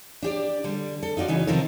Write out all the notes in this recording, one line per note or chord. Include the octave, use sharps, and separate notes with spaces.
D4 G4 D5
D3 G3
A4
D#4 F4 F#4 D5
C#3 E3 C#4 D#4
C3 D#3 F3 D#4 A4 A#4